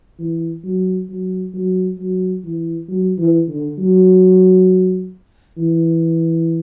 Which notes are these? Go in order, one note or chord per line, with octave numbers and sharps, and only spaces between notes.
E3
F#3
F#3
F#3
F#3
E3
F#3
E3
D3
F#3
E3